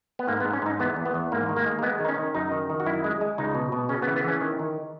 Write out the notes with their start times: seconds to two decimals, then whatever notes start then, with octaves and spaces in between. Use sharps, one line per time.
0.19 B3
0.27 G#2 A#3
0.40 B3
0.45 G#2
0.53 C#4
0.62 G#2 D#4
0.80 E2 B3
0.96 E2
1.05 B3
1.14 E2
1.32 G#2 A#3
1.49 D#3
1.56 A#3
1.66 G#3
1.79 A#3
1.83 G#3 B3
2.00 D#3 D#4
2.08 C#4
2.18 D#3
2.34 F#2 D#4
2.52 D#3
2.70 D#3
2.80 F#4
2.86 F#2 E4
3.04 G#3
3.21 G#3
3.38 C#2 D#4
3.55 B2
3.72 B2
3.89 C#3 C#4
4.02 B3
4.08 E3
4.16 B3
4.24 E3 C#4
4.41 D#3
4.59 D#3